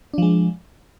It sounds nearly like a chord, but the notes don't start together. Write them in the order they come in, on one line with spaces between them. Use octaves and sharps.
D4 F3 G#3